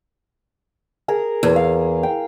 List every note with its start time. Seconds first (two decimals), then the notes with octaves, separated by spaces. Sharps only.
1.08 G#4 A#4 A#5
1.43 E2
1.56 F5
2.03 G5